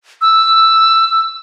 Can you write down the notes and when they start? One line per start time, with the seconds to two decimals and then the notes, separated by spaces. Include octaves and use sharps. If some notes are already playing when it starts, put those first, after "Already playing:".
0.21 E6